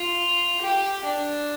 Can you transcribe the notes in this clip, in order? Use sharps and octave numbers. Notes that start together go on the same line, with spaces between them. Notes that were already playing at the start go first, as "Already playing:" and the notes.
Already playing: F4
G4
D4